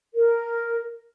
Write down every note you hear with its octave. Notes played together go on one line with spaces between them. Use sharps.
A#4